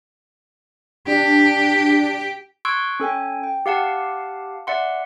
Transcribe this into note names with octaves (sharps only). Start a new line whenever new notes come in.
D4 G4
C6 C#6 E6 F#6 G#6 D7
C#4 A4 G5 G#5
G5
G4 F5 F#5 A5
D5 E5 F#5 C6